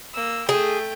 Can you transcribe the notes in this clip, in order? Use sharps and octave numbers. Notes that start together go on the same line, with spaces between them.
A#3 E6
A3 G#4 G5